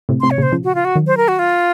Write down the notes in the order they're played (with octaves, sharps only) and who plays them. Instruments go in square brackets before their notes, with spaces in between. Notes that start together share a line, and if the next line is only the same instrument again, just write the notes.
[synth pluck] A2 C3
[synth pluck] A2 C3 [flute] C6
[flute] C#5
[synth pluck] A#2 C#3 [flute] C5
[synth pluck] C#3 F3
[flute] F#4
F4
F#4
[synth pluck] D#3 F#3
[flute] C5
A#4
F#4
F4